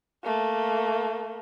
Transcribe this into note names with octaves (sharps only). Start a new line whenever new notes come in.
A3 A#3